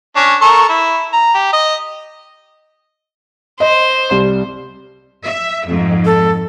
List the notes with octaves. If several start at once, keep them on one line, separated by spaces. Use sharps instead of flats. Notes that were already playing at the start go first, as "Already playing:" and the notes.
C#4 D4 C#5
A4 A#4 C#6
E4
A#5
G4
D#5
C5 D#5
C2 G3
E5
F2 G#2
A4